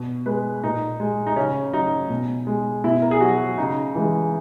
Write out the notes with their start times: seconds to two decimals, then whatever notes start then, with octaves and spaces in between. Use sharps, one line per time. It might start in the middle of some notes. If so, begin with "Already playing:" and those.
Already playing: B2
0.26 G#3 B4
0.64 A#2 D#4
1.00 G#3
1.27 D#4
1.36 C#3 C#4
1.73 F#3 D#4
2.10 B2
2.47 G#3
2.84 B2 E4
3.02 A#4
3.11 G#4
3.20 F#3 F#4
3.58 C#3 D#4
3.95 E3 G#3